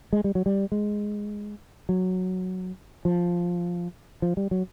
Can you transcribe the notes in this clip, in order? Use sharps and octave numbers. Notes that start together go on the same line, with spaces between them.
G#3
G3
F#3
G3
G#3
F#3
F3
F3
G3
F#3